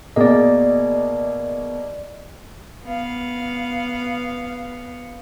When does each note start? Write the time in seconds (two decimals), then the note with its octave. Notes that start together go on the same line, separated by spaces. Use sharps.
0.16 B2 A#3 G#4 D5 D#5
2.85 B3 F5